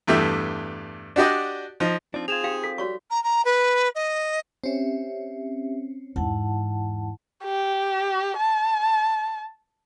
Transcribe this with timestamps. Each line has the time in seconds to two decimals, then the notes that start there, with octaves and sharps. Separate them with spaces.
0.07 E2 G2 A3 G4 E5
1.16 D4 F#4 G4 D5 D#5
1.80 F3 D#4
2.14 F3 C4 D4 D#4
2.28 C4 F4 G#4 G#6 E7 F7
2.44 G4 F5 G5
2.64 A4 B6
2.78 G3 F#4 C#5 C#6
3.10 A#5
3.24 A#5
3.45 B4
3.95 D#5
4.64 C4 C#4 G4 E5
6.16 E2 G#2 E4 F#5 A5
7.44 G4
8.37 A5